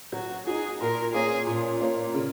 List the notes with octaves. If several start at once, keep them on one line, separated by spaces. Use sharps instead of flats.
F#3 F#4
D#4 F#4 G#4
A#2 A#4
A#3 C#4 G#4
A#2
A#3 C#4
C#3